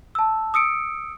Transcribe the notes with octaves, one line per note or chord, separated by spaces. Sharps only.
A5 E6
D#6 E6 C#7 D7